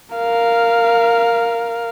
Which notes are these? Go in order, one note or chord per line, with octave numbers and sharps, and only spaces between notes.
A#4 F5